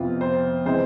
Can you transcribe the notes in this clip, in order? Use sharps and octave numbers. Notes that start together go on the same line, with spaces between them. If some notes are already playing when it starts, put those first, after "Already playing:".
Already playing: F2 C3 F3 B3 F4
C5
C3 E3 G#3 C5